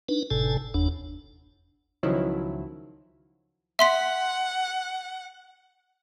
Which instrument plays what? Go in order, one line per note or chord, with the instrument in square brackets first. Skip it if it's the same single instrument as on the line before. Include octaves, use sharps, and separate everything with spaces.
[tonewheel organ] D4 D#4 B4
G1 A2 C3 A4 G#5 A5
F#1 E2 D4
[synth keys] C#2 D#3 F3 F#3 E4
[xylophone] E5 C6 B6 [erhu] F#5